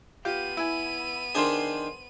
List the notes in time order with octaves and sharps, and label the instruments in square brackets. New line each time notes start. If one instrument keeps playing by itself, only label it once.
[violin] B3 D#7 [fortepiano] F4 G4
[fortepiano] E4 G#5
[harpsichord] D#3 D4 [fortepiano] G#4 C5 C6